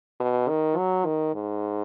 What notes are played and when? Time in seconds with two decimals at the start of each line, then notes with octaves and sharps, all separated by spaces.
0.20 B2
0.49 D#3
0.77 F#3
1.06 D#3
1.35 G#2